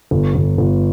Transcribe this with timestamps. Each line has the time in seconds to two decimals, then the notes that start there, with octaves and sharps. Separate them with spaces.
0.11 G1
0.35 G1
0.58 G1